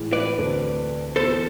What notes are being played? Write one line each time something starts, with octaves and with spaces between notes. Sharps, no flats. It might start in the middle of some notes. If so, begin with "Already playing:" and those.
Already playing: A2 E3 G#3
B4 D5
D2 D3 A3 C4
E3 B3 F4 G#4 A4 C5